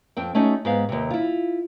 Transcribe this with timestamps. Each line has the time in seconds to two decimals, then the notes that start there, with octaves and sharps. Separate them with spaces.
0.17 F2 C4 G5
0.35 A3 C#4 D#4 F#4
0.65 G#2 B3 F5
0.89 D#2 C3
1.10 E4 F4